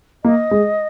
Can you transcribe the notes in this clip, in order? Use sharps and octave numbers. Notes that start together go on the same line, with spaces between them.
A#3 D#5
G#3